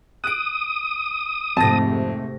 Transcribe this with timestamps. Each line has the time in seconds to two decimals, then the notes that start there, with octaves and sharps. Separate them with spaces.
0.24 D#6 F#6 D7
1.57 F2 G#2 C3 A3 A5 A#6